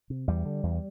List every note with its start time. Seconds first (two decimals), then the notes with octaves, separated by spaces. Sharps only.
0.10 C3
0.28 E2 G3
0.45 D3
0.63 E2